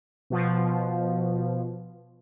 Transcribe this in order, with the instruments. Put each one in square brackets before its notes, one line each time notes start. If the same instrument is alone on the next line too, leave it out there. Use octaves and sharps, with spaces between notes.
[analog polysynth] B2 F3